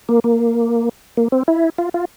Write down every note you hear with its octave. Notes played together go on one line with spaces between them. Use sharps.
A#3
A#3
A#3
C4
E4
F4
F4